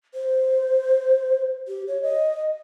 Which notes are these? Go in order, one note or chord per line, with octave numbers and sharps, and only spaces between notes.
C5
G4
C#5
D#5